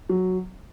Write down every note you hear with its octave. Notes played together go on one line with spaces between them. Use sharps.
F#3